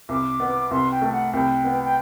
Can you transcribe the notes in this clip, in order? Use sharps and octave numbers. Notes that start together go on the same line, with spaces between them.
C2 D6
B3
C2 C6
G5
A3
F#5
C2 G5
B3
G5